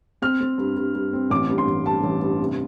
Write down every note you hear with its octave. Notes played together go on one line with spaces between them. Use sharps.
C4 F6
C4
G2
G2
G2
C4
A1 D6
G2
C6
A1
G2 A5
A1
G2
C3